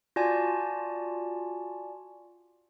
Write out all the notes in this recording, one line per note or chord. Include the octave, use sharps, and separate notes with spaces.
F4 F#4 D5 G#5 A5